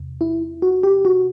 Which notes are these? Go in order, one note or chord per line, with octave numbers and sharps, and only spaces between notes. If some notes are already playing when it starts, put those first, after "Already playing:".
Already playing: E2 C3
E4
F#4
G4
F#4